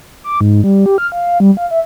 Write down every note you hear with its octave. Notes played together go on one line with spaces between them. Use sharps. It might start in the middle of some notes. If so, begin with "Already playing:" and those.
D6
G#2
G3
G4
F6
F5
G3
F5
E5